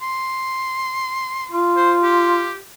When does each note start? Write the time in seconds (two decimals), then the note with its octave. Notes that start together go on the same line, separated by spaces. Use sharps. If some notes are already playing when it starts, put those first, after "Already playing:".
0.01 C6
1.52 F4
1.77 C5
2.03 G4